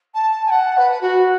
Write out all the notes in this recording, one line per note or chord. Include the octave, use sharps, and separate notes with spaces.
A5
G#5
F#5
B4
F#4